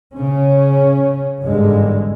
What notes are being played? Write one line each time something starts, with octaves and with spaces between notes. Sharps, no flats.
C#3 C#4
G#1 E2 G2 D3 G#3